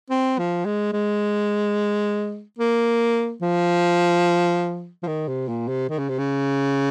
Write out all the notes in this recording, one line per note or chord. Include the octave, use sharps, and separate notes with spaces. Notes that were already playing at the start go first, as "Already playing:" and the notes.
C4
F3
G#3
G#3
A#3
F3
F3
D#3
C3
A#2
C3
D#3
C#3
C3
C#3